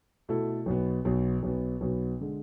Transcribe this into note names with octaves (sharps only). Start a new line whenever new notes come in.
B2 A3 E4 A4
B1 B2 B3
B1 B2 B3
B1 B2 B3
B1 B2 B3
D3 G#3